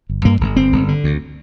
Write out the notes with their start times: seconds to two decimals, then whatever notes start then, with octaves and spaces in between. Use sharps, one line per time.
0.09 G1
0.25 G2 A#3
0.41 G1
0.56 G1 C4
0.72 G1
0.88 D3
1.04 D2